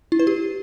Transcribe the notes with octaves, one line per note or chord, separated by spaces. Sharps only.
E4
B4
G4